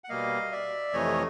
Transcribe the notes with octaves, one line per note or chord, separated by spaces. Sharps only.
F#5
B2 G3 A#3 D#5 F5
D5 E5
F2 C3 E3 A3 C#5 D#5